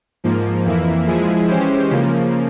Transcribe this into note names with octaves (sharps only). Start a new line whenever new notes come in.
G#2 F3 A#3
F2 E3 A#3 E4
F3 G#3 E4 G#4
E3 G#3 C#4 G4 C5
C#3 F3 A#3